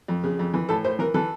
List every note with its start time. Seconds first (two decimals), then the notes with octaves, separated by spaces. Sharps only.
0.08 F2
0.24 C#3
0.39 F2
0.54 E3
0.69 A2 A4
0.84 A2 C5
0.99 E3 A#4
1.14 E3 A4